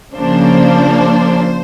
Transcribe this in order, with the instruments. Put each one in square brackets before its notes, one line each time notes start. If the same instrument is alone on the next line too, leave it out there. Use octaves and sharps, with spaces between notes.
[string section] C#3 F3 A#3 D4 C5